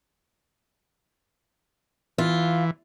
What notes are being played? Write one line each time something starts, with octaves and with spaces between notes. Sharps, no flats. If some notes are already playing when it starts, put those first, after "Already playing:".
E3 F4